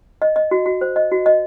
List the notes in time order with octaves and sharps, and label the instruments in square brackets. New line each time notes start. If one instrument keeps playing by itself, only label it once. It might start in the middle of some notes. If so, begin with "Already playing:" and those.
[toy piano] D#5
D#5
F#4
F#4
C5
D#5
F#4
D#5